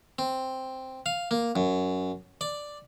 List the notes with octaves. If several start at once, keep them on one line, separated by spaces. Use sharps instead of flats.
C4
F5
A#3
F#2
D5